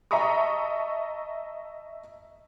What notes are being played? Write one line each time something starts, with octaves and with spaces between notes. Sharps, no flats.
D#5 E5 A5 A#5 C#6 D#6